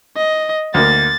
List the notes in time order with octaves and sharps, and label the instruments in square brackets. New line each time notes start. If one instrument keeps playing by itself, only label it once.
[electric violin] D#5
[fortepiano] D2 A#3 [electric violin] A6